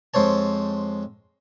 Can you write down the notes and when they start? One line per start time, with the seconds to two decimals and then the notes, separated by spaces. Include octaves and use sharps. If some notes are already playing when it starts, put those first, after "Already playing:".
0.14 F2 G#3 C5 C#5 A5